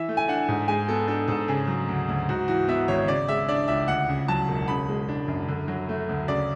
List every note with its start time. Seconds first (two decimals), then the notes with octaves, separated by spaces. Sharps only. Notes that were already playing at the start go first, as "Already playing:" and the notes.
Already playing: E3 E5
0.09 A3
0.17 G#5
0.28 D4 F#5
0.49 G#2
0.68 G#3 G#5
0.89 B3 A4
1.08 D4 A4
1.28 G#2 A4
1.48 C#3 G#4
1.68 F#3
1.89 D2
2.09 D2
2.29 G#2 F#4
2.48 E3 F#4
2.68 B3 E5
2.88 G#1 C#5
3.08 C#3 D5
3.28 G#3 E5
3.48 D4 D5
3.68 C#2 E5
3.88 D2 F#5
4.09 C#3
4.28 F#3 A5
4.48 E1
4.68 C#3 B5
4.89 G#3
5.09 D4
5.28 F#2
5.48 D3
5.68 F#3
5.89 A3
6.09 D2
6.28 C#3 D5